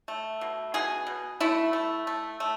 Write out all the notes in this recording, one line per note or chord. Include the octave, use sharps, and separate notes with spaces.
A3
B2
B2 G#4
B2
A3 E4
A3
A3
A3